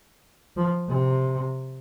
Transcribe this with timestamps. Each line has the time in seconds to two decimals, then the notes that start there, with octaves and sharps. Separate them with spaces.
0.57 F3
0.89 C3